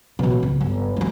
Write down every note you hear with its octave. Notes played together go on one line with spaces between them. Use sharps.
A1 B2
C#2
G1
G#3 D#4